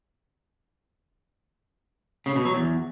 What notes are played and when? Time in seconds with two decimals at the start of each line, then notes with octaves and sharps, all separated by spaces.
2.26 C#3
2.36 B2
2.45 F#3
2.55 E2